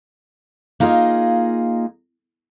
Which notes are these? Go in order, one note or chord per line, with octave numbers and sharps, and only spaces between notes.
A#3 D#4 F4 G#4 D#5